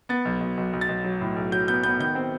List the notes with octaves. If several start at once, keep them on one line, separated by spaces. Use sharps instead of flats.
B3 A6
B1
B1
B1
B1
A6
B1
F#3
A2
B1
F#3 G6
B3 G6
B3 G6
D#3 G6
C4